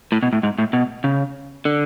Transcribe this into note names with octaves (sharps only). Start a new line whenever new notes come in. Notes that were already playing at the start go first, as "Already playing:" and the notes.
A2
B2
A2
G#2
A2
B2
C#3
D3